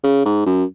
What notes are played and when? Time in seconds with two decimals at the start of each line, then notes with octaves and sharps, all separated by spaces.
0.04 C#3
0.25 G#2
0.46 F#2